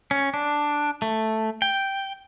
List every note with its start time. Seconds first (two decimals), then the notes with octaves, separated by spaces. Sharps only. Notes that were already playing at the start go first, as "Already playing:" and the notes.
0.11 C#4
0.34 D4
1.02 A3
1.62 G5